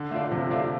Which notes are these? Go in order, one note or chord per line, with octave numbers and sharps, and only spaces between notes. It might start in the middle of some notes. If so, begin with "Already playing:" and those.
Already playing: D3
A3 F4 D5
C3 F3
A3 F4 D5